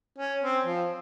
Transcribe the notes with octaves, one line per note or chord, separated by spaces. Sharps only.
C#4
C4
F3